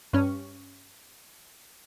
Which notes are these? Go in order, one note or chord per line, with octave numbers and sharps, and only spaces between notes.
G2 C#4